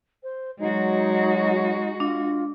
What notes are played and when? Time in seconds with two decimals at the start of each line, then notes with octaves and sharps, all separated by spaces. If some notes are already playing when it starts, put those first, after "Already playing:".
0.23 C5
0.60 F#3 G#3 D#4 F#4
2.00 D4 F4